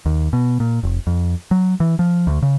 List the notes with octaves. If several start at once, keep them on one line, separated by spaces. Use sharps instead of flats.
D#2
B2
A#2
F1
F2
F#3
E3
F3
D2
C#3